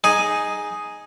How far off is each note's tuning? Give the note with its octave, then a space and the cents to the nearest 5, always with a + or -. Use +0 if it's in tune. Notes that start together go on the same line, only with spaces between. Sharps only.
D#4 +0 G#4 +0